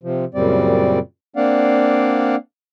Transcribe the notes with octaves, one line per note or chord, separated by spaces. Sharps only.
C3 F3
F#2 A#2 C#3 G3 C4 D5
A#3 C4 D4 D5 F5 F#5